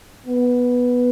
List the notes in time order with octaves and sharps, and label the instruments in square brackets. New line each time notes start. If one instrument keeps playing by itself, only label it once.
[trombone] B3